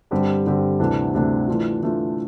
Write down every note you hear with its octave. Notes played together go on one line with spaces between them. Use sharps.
G2 D3 G3 C4 G4
G2 D3 G3 C4 G4
D2 C3 E3 A3 D4
D2 C3 E3 A3 D4
E3 A3 D4 F4
E3 A3 D4 F4